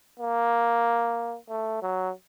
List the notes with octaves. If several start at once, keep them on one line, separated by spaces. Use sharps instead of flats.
A#3
A3
F#3